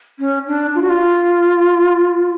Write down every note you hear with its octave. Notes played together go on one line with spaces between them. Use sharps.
C#4
D4
F4
F#4
F4